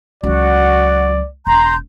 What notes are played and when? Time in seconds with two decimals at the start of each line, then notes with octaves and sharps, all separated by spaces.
0.23 C#2 F#3 F#4 D5
1.47 E1 A#5 C6 G6